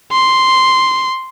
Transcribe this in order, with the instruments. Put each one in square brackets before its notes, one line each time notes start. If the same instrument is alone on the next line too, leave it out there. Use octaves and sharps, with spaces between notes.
[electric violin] C6